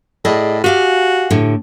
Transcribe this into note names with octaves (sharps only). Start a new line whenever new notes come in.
A2 G#4 D5 D#5
F#4 G4 F5 G#5
A2 D3